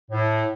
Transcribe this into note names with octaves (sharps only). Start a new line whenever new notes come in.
A2